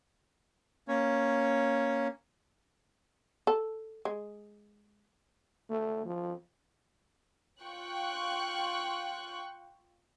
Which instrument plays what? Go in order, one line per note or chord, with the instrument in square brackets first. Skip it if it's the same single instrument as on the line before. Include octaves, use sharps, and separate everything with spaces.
[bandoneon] A#3 C#4 C#5
[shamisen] A4
G#3
[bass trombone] A3
F3
[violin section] F4 G5 C#6 F#6